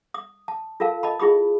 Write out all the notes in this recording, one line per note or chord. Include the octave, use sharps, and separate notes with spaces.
D#6
A5
F4 A4 A#4 F5 A5
D#5 A5 B5
E4 F4 G#4 B5 D#6